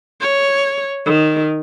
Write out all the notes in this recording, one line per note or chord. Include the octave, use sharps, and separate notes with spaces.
C#5
D#3